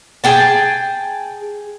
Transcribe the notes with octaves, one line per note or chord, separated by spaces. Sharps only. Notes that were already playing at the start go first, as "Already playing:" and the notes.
G#4 G5 A5